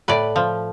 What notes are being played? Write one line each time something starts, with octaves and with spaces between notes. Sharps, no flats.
A2 B4 D5
F3